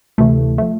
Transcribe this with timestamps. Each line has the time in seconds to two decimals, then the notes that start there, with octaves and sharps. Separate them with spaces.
0.18 D2 C3 E3 A3
0.58 F3 A3